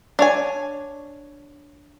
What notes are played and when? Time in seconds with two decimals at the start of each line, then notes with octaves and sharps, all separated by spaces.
0.19 D4 C#5 G#5